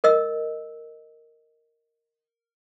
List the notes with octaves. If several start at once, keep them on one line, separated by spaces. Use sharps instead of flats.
A#4 D#5 E6